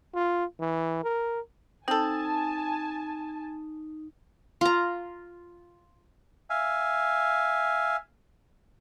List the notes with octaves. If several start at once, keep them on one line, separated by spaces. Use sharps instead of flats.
F4
E3
A#4
C4 D#4 A4 G#5 A5
F4 A#5
E5 F5 G#5